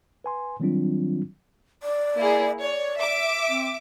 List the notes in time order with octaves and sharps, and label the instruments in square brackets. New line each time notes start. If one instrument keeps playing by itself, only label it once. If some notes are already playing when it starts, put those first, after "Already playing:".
[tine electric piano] B4 G#5 C6
D#3 F#3 G3 C4 D4 F4
[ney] D5
[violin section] A#3 E4 G#4
[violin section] C#5 [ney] D5
[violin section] E5 D6
[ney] C4